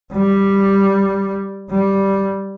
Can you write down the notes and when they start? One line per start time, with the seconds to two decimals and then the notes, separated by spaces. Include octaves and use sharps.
0.13 G3
1.70 G3